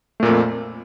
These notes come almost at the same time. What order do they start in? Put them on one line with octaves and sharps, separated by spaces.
A3 A#2 A#3 F2